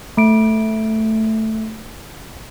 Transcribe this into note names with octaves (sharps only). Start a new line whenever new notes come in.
A3 D7